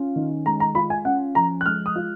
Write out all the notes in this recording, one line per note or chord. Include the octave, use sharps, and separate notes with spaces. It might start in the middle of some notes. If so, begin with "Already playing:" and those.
Already playing: C#4 F4
D#3
G#3 A#5
A#5
F4 B5
G#5
C#4 F#5
F3 A#5
F#6
G#3 F6
D#6
F4